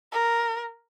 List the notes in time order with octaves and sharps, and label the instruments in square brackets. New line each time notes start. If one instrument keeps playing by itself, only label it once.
[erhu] A#4